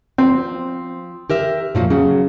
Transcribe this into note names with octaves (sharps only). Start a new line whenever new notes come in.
F3 C4
G4 A#4 E5
A#2 F3 F#3
C#3 F#3